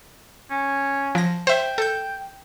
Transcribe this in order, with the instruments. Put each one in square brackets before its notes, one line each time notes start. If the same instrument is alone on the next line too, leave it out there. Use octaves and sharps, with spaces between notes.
[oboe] C#4
[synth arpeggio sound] F3 A#6
[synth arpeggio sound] C5 E5 [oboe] G5
[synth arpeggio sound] A4 G6